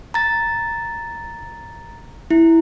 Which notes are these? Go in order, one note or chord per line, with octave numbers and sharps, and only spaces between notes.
A#5 A6
E4